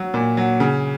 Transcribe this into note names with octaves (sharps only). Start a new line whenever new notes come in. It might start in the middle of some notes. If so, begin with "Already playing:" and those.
Already playing: F#3
A#2
F#3
C#3